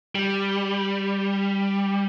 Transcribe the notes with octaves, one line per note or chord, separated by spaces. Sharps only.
G3